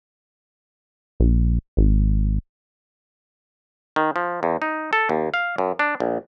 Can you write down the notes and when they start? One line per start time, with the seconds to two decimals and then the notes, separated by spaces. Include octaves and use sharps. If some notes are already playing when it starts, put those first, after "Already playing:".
1.20 A#1
1.77 G#1
3.96 D#3
4.16 F3
4.43 E2
4.62 D#4
4.93 A4
5.09 D#2
5.34 F5
5.58 F#2
5.79 D4
6.00 A#1